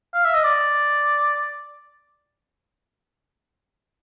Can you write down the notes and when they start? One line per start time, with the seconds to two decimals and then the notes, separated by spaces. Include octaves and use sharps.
0.14 F5
0.24 E5
0.34 D#5
0.44 D5